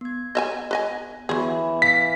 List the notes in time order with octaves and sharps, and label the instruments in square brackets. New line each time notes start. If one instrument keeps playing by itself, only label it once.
[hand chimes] B3 G#6
[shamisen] D#5 E5 G#5
B4 D#5 G#5
[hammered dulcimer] E3 [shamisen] F#3 G#4 [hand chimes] B3
[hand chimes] E5 F5 [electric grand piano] B6